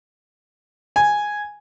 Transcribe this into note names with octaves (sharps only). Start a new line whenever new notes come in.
G#5